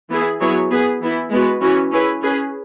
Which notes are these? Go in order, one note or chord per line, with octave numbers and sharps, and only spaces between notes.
E3 B3 E4 G#4
F#3 B3 E4 G#4 C#5
B3 G#4 B4
E3 B3 E4
G#3 B3 F#4 B4
E3 C#4 F#4 B4
C#4 E4 G#4 B4
C#4 G#4 B4